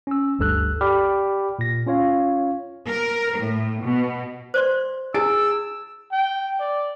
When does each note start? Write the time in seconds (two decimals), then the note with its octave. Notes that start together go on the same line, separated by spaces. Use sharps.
0.07 C#4 E6
0.39 G1 D2 G2 A4 E6 F#6
0.81 G4 D5 G5 B5 D6 F6
1.59 A#2 A#6
1.86 C#4 F4 C#5 F5
2.88 A#4
3.40 A2
3.83 B2
4.54 C5 D5 C6
5.14 E4 G#4 E6 A6 D7
6.12 G5
6.60 D5